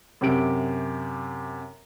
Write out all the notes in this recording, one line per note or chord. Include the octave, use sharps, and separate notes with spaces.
F#2 C3 G4 D7